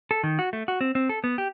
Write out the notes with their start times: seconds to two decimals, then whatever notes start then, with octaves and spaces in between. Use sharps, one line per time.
0.11 A4
0.23 D#3
0.39 F#4
0.53 A3
0.68 F#4
0.81 C4
0.95 C4
1.09 A4
1.24 B3
1.38 G4